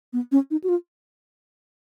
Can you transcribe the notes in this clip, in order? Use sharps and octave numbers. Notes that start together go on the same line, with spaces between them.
B3
C#4
D#4
F#4
F4